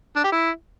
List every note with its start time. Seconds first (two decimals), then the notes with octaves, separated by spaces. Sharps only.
0.16 D4
0.24 G4
0.32 E4